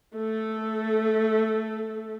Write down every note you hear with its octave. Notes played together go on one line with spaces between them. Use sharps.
A3 A4